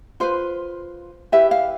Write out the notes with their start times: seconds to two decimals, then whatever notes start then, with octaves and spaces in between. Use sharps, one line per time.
0.20 F4 B4 C5
1.32 E4 G4 B4 E5
1.51 F5